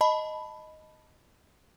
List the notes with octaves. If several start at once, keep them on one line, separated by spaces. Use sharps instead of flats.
D#5 A5 B5